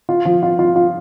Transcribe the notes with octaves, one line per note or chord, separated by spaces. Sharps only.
F4
F3
F4
F4
F4